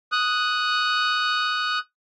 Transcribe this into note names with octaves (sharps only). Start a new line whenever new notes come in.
D#6 F#6